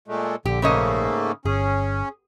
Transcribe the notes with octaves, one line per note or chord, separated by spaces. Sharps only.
A#2 G#3 A3
A#1 D3 G4
G#2 C#3 A3 A#3 C#5 D#5
G1 C#4 G#4